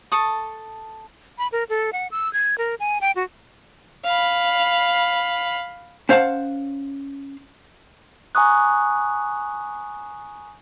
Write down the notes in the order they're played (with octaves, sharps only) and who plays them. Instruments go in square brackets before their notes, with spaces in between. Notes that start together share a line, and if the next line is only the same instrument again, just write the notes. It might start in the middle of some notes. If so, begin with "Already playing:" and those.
[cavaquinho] A4 A5 C#6 D#6
[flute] B5
A#4
A4
F#5
E6
G#6
A#4
G#5
G5
F#4
[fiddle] F5 B5
[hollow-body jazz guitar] C#4 C5 F5 F#5 A5
[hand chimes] G#5 A#5 C#6 D#6 F#6